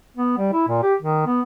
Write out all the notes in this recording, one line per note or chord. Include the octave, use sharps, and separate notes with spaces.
B3
G3
E4
A#2
G4
D#3
B3